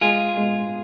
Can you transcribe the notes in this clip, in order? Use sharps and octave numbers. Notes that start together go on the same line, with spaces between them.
G#3 F4 G#4
G#3